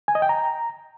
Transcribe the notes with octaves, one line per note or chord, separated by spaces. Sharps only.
G#5
D#5
G5
A#5